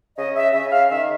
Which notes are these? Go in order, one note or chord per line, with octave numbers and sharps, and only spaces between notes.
C#3 D#5
E5
C#3 E5
F5
D#3 E5